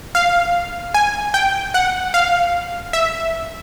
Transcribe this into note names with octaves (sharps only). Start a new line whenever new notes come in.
F5
G#5
G5
F#5
F5
E5